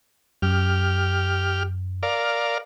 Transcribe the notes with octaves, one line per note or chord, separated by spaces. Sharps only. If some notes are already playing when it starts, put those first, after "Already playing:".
F#2 G4 F6
A#4 D5 F5